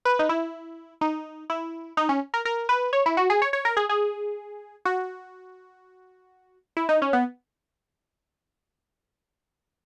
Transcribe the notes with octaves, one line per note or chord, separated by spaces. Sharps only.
B4
D#4
E4
D#4
E4
D#4
C#4
A#4
A#4
B4
C#5
E4
F#4
G#4
C#5
C#5
A#4
G#4
G#4
F#4
E4
D#4
C#4
B3